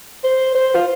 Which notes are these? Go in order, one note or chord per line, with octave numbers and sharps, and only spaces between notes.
C5
C5
F4